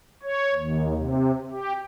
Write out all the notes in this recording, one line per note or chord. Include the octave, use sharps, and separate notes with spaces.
C#5
D#2
C3
G4